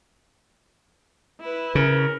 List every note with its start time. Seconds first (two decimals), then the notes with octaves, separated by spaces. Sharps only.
1.41 E4 B4
1.75 C#3 A#4